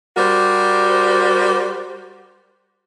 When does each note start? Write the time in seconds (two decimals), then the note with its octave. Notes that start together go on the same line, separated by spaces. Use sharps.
0.17 G3 F#4 A#4 C5